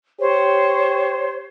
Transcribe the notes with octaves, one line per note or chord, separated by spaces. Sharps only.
G4 C5 C#5